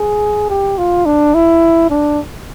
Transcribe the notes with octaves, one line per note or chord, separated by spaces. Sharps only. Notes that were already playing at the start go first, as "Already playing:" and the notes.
Already playing: G#4
G4
F4
D4
E4
D4